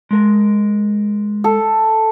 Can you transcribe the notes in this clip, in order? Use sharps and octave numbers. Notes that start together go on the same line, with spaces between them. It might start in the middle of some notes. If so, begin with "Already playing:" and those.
G#3 A#4
A4